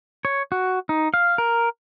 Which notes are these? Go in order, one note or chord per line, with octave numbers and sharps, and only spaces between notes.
C#5
F#4
D#4
F5
A#4